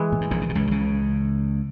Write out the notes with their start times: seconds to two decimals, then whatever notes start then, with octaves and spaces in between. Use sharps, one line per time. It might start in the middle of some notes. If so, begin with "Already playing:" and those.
Already playing: E3 G#3
0.12 A#2
0.21 G#2
0.31 A#1 A#2
0.41 C#3
0.49 B2
0.55 C#2 C#3
0.67 D#3
0.71 C#2 C#3